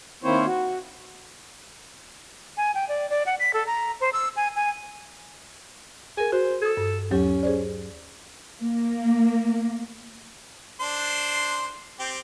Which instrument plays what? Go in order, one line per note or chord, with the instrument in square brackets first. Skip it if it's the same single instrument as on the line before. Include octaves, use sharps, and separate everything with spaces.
[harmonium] D#3 A#3 C4 E4 C5 C#5
F#4
[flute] G#5
G5
D5
D5
F#5
B6
A4
A#5
C5
E6
G#5
G#5
[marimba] G#4 A#4 [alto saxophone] G#5
[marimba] F#4 [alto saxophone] C5
[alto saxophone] A4 [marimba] D#6 G#6
[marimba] G2
[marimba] D#2 F#3 G4 [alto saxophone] C#4
[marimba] G#4 C5 D5
[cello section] A#3
[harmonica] D4 C5 C6
C4 G4